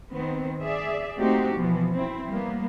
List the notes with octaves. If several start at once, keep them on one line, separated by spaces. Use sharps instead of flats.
D#3 B3 C4
G#4 D5 E5
A3 A#3 C4 D#4 F#4 G4
B2 E3 F3 B3
C4 E4
G3 A#3 B3